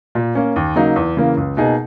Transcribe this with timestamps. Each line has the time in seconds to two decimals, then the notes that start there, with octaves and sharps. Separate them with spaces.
0.15 A#2
0.35 A#3 C#4
0.56 D#2
0.75 C#3 F#3 A#3 D#4
0.96 E2
1.17 C#3 E3 A#3
1.37 C#2
1.57 B2 A#3 D#4 G#4